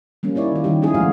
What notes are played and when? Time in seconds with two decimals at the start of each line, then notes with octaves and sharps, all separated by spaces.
0.23 G3 A#3 C#4
0.35 D#4 E4 C#5 D5
0.52 D#3 F4
0.64 D#3 G3 C#4 D#4 G4
0.82 G3 B3 C#4 E4 G#4
0.94 A#2 F3 G#3 A3 F#4 F5